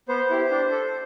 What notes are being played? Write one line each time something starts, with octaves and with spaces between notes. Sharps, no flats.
B3 C5
E4 G4
D4
A4